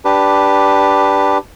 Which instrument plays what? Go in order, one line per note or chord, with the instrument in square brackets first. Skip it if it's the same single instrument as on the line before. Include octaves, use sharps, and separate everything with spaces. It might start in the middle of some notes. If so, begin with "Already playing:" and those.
[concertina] D4 G4 B4